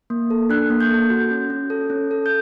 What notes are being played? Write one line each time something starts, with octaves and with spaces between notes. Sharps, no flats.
A#3
A4
D4 F#6
A#3
G6
A4
F#4
C#4
C#4
A4
C#4
A4
G6